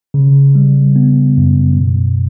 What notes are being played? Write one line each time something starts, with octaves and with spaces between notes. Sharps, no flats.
C#3
G3
B3
F#2
B2